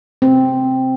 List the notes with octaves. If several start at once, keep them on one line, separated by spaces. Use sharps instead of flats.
C4